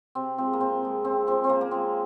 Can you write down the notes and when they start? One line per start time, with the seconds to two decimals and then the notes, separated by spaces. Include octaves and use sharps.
0.15 C3 C4
0.38 F3 G#3 C4
0.53 A#3
0.61 C3 C4
0.83 F3 G#3
1.04 C#3 C4
1.27 F3 G#3 C4
1.44 C4
1.49 C#3 A#3
1.61 A#3
1.71 F3 G#3 C4